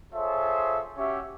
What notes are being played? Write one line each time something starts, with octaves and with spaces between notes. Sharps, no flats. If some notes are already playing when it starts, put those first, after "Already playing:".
F4 G#4 A4 C5 C#5 E5
C#4 F#4 G4 E5